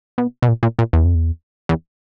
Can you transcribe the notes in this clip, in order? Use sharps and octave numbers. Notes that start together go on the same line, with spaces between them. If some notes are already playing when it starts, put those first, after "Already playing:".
B2
B2
A#2
A#2
A#2
E2
F2
E2
E2